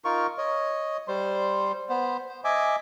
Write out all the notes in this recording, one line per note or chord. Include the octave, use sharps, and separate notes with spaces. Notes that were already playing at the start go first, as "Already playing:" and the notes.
D#4 F4 A#4 C#6
C#5 D#5
G3 C5 C6
B3 C5
C5
D#5 E5 G#5 D6